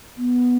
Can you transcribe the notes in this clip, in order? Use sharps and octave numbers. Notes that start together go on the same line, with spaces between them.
B3